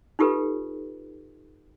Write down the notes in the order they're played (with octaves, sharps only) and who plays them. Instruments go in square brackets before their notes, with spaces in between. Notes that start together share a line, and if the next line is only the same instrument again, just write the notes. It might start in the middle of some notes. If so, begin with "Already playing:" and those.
[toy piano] D#4 F4 G4 A4 B4